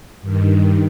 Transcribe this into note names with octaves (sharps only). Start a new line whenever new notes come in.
G2 D#3